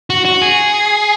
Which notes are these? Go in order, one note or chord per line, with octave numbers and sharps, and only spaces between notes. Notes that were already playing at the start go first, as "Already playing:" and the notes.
F#4
F#4
G#4